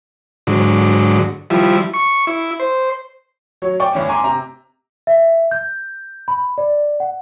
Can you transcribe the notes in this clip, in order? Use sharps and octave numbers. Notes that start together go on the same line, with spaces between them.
G#2 D3 F#3
F3 G3 E4
C#6
E4
C5
F#3 C#5
D5 G5 C#6
G1 E2 C#4
G#5 A#5 C6 D6
C3 A#5
E5
G6
B5
D5
F#5